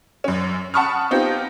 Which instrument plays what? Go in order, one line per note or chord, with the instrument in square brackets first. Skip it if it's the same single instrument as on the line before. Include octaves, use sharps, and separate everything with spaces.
[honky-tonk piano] F#2 C#4
F#5 A5 B5 C#6 D#6 F6
B3 C4 D#4 F4 G4